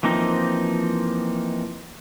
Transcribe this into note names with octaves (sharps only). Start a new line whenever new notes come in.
E3 F3 A#3 C4 D#4